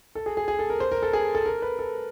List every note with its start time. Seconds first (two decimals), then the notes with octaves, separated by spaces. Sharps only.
0.15 A4
0.26 G#4
0.37 G#4
0.48 G#4
0.59 A4
0.70 A#4
0.80 C5
0.92 A#4
1.03 A4
1.13 G#4
1.35 A4
1.46 A#4
1.62 B4
1.79 A4